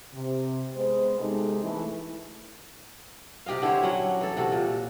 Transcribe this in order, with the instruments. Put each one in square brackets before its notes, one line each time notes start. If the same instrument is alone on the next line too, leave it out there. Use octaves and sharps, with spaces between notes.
[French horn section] C3
G#3 B3 C5
C3 G#3 D#4 A4
E3 A3
[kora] C3 G4 D#5 F5
D3 E4 C5 C#5
F#3 C#4 F#5
E3 A4
C3 F#4 A4
A#2